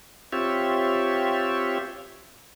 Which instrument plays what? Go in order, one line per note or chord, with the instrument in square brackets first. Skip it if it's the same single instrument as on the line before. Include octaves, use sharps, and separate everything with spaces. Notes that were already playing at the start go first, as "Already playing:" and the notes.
[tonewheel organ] C4 F4 G4 C#5 E5